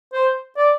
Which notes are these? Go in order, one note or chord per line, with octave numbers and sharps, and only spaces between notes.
C5
D5